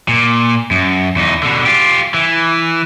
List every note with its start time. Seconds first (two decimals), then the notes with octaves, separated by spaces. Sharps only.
0.08 A#2
0.71 F#2
1.16 E2 D#4
1.43 B2 D3
1.66 F4 G4
2.14 E3